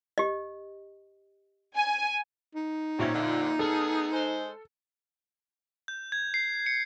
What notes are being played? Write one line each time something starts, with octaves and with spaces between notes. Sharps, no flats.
G4 D#5
G#5
D#4
A#2 F#3 C4 C#4 E5 G#6
F2 D3
A3 B3 G#4 A4 F6
G#3 C5
G6
G#6
C7
C#7